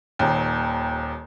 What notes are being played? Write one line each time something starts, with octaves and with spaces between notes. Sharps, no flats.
D#1 D#2